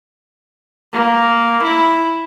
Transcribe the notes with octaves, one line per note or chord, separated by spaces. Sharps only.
A#3
E4